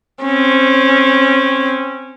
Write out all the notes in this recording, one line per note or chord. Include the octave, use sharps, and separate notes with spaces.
C4 C#4